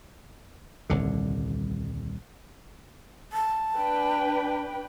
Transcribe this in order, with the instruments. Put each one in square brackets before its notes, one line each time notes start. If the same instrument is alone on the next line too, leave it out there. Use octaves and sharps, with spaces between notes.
[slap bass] D#1 C2 D3
[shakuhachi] A5
[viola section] D4 B4 G5